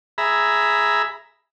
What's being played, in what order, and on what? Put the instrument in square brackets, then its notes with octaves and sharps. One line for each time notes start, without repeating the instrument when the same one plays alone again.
[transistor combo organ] G#4 E5 A#5 B5